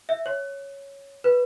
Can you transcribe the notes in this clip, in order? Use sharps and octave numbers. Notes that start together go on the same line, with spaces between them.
E5
C#5
B4